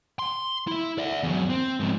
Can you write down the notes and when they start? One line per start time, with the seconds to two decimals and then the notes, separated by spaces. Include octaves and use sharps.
0.19 C6
0.67 E4 E5
0.98 D5 E5
1.23 E2 F#3
1.49 C4
1.80 G#2 F3